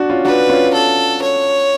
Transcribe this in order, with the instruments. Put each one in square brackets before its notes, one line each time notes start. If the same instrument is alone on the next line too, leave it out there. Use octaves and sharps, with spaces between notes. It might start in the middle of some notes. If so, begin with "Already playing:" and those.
Already playing: [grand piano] D4 F#4
C#4 F4
[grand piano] D4 F#4 [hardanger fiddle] B4
[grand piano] C#4 F4
[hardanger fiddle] A4
C#5